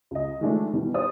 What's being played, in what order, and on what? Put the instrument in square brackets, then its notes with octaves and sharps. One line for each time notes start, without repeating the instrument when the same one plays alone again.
[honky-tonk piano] C#2 D#5
D#3 F3 G#3 A3 D4
B2 D#3 E3 G3
G4 C5 D5 D#6